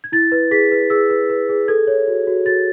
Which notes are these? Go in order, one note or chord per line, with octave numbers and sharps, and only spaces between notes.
G#6
E4 A6
B4
G#4 B6
B4
G#4 E6
B4
B4
G#4
A4 G#6
C#5
F#4
F#4
F#4 A6